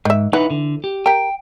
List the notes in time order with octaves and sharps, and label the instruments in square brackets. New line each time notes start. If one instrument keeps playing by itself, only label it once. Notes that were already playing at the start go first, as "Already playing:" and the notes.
[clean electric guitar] G#2 [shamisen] D#3 E5
[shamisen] E3 [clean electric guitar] D#4 B4 F#5
[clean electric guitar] D3
G4
[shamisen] G4 A#4 [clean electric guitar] G5